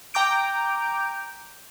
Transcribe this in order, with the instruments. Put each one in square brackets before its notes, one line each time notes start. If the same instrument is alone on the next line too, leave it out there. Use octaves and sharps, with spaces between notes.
[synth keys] G5 A#5 D6 G6 D7